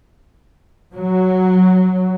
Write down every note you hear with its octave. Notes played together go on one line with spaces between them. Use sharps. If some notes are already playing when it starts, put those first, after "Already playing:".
F#3